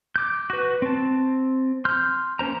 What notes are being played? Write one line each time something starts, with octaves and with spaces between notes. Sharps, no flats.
D6 G6
F#4 B4
C4 A5
C6 F6 G6
A#3 C#4 C5 A#5